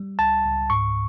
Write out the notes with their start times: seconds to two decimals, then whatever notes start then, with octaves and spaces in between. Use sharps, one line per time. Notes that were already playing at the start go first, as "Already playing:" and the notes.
Already playing: G3
0.19 C#2 A5
0.44 C#2
0.70 G#2 C#6